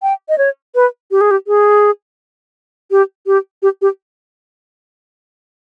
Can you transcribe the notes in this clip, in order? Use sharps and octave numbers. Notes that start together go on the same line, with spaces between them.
G5
D#5
C#5
B4
G4
G#4
G4
G#4
G4
G4
G4
G4